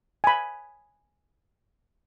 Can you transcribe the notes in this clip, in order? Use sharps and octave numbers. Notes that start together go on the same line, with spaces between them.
G#5 B5